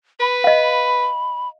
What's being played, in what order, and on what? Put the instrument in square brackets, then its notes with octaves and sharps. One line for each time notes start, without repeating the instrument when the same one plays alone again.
[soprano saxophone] B4 [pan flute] B5
[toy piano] D#5 F5